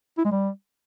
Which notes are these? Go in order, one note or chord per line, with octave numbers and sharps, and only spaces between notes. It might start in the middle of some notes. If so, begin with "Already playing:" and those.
E4
G#3
G3